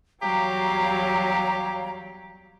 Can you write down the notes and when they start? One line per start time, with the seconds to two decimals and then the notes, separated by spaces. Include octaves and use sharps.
0.22 E2 F#3 G3 G4 C#5 F5 A#5